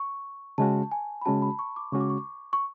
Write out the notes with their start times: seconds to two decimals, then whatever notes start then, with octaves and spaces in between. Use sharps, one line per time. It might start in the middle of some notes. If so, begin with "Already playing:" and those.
Already playing: C#6
0.58 C#3 G#3 C#4 F#4 A5
0.92 G#5
1.21 B5
1.25 C#3 G#3 C#4 F#4 A5
1.42 B5
1.59 C#6
1.76 D6
1.92 C#3 G#3 C#4 F#4 C#6
2.01 D6
2.09 C#6
2.53 C#6